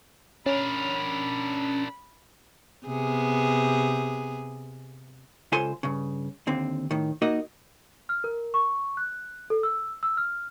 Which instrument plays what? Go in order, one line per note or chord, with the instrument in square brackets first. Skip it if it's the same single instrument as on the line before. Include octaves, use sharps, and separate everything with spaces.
[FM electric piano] C#4 [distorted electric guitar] D4 A#4 [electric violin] B5
[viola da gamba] C3 B3 G#4
[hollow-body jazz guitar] C#2 F4 A4 C5 G#5 C6
G2 C#3
D#2 D3 C4
A2 D#3
A#3 D#4 F#4 A#4 D#5
[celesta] F6
A#4
C#6
F#6
A4
E6
E6
F6